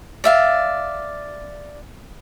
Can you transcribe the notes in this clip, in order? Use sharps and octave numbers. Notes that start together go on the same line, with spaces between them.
D5 E5 F5